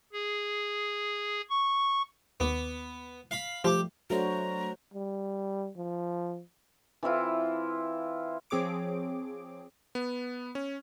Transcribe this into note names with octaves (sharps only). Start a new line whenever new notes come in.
G#4
C#6
D#2 B3 D6
F5 B5
F3 G3 A3 G4 D6
F#3 A3 D4 F#4 C5 C#5 A#5
G3
F3
E3 C4 E4 F4
F3 C4 G#4 C#5 D6 D7
B3
C#4